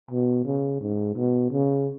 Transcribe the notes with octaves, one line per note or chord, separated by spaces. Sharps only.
B2
C#3
G#2
B2
C#3